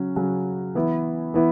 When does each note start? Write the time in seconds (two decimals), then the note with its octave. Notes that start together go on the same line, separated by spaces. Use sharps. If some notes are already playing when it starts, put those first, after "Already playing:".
Already playing: C#3 F#3 C#4 F#4
0.16 C#3 F#3 C#4 F#4
0.75 E3 B3 E4
1.34 E3 B3 E4